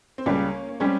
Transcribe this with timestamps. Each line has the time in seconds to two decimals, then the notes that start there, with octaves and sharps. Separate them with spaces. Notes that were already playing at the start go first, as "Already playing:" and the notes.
0.18 C4
0.26 C#2 C#3 G3 A#3 C#4
0.69 C#4
0.80 G3 G#3 C4 C#4